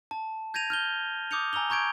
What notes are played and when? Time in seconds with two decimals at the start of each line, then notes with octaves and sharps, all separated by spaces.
0.11 A5
0.54 G6 G#6 A#6 D#7 F7
0.70 F6 G6 G7
1.31 D6 D#6 G6 C#7 F7
1.53 G#5 A#5 E6 F7 G7
1.70 A#5 C#6 G6 G#6 D7